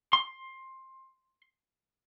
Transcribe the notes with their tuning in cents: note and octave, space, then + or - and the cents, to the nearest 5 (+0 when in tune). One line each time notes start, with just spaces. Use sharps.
C6 +15